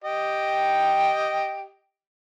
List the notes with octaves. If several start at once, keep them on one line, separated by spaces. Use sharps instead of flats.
G4 D#5 G5